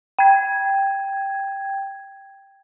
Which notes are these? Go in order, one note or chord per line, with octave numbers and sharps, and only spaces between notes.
G5 G#6